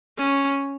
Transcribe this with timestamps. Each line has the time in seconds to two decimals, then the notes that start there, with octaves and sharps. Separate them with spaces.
0.18 C#4